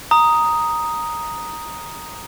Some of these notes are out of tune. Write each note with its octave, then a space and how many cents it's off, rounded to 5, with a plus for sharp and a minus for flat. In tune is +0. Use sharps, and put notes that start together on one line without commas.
A#5 +0 D#6 +0